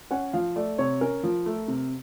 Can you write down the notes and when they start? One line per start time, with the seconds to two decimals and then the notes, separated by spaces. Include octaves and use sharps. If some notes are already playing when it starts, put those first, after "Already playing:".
0.11 C#4 F#5
0.33 F3 F5
0.56 A3 D5
0.78 C3 C#5
1.01 C#4 A#4
1.23 F3
1.46 A3
1.68 C3